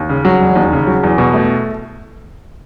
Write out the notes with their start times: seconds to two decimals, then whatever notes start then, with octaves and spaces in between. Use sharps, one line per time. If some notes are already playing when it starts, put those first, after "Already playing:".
Already playing: D#2
0.09 C#3
0.25 F#3
0.41 E1
0.55 D#2
0.72 C#3
0.87 F#3
1.03 E2
1.18 B2
1.34 A3